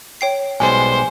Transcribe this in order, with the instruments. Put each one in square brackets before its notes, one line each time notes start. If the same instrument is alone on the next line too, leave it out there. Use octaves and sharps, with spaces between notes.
[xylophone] C#5 G5 C7
[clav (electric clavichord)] B1 G3 G#3 [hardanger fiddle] C5 [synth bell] G#5